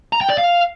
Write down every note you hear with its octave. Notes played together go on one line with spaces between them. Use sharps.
A#5
G5
D5
F5